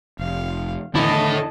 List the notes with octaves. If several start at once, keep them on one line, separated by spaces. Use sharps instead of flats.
F1 F5
E2 D3 D#3 E4 A4 D#5 A5